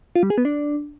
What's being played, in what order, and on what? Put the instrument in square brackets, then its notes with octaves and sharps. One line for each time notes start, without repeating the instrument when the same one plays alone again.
[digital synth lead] F4
G3
G#4
B3
D4